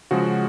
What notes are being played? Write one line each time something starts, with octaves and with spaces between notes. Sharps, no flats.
C#3 F3 G#3 F#4